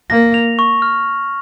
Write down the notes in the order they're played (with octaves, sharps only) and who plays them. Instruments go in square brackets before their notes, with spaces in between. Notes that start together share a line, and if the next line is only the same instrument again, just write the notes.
[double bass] A#3 [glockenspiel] A#6
[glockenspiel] F7
C#6
F6